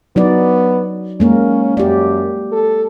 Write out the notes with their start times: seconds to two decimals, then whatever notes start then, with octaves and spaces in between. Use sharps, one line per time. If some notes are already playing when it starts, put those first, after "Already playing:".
0.16 F#3 B3 D#4 D5
1.20 G#3 A#3 C#4 A#4
1.77 F#2 G4 D5
2.52 A4